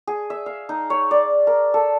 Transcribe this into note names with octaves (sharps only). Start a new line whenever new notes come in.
G#4
E5
F5
D#4
C#5
D5
A#4
A4